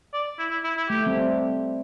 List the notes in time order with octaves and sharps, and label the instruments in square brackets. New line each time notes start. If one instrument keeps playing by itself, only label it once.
[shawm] D5
E4
E4
E4
E4
[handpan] A3 [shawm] G4
[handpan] G3 C4